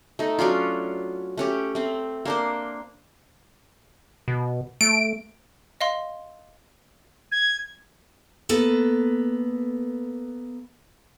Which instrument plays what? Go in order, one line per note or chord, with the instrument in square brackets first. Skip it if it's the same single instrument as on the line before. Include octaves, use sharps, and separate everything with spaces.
[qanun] A3 D#4
F#3 C#4 D4 F4
A3 C#4 G4
A3 C4
A#3 D4 C5
[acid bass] B2
[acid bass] A3 [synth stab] D7
[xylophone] D#5 F5 C6
[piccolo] G#6
[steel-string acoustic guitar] A#3 B3 A4 B4